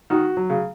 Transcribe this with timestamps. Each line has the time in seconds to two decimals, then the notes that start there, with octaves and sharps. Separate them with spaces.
0.10 D#3 F#4
0.37 F#3
0.50 C#3